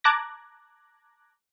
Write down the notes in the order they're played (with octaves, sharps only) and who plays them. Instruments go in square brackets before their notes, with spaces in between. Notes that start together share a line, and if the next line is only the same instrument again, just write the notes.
[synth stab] A5 A#5 D6 F#6 G#6 A#6